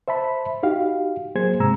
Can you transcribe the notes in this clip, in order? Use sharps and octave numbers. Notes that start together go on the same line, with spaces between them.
C5 E5 A5 B5
D#4 F#4 G4 F5
F#3 A#3 G#4 C5 G#6
G#2 C3 G#3 A#5 E6